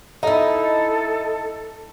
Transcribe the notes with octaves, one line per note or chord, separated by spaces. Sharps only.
D#4 E4 A4 D#5